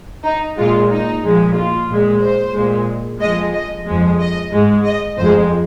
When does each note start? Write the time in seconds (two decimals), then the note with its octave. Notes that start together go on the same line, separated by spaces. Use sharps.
0.25 D#4
0.58 A#2 G#3 F4
0.91 D#4
1.24 A#2 F3 G#3
1.57 F4
1.89 A#2 G#3
2.22 C5
2.55 A#2 G#3
3.21 F2 F3 G#3 D#5
3.54 D#5
3.87 F2 F3 G#3
4.20 D#5
4.52 G#2 G#3
4.86 D#5
5.18 F2 F3 G#3 C5